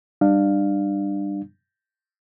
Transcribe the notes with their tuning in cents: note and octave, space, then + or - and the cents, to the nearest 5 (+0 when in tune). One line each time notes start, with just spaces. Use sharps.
G3 +5 D4 +30 F5 +0